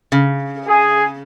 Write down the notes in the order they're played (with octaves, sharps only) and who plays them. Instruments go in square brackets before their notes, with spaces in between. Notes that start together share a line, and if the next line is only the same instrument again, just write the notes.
[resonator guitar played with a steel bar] C#3
[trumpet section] G#4